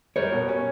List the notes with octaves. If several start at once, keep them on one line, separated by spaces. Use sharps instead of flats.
G3 A#4 C#5
B2
C#4